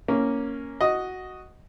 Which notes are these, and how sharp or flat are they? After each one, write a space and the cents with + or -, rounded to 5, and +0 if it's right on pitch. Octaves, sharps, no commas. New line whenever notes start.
A#3 +0 C#4 +0
F#4 +0 D#5 +0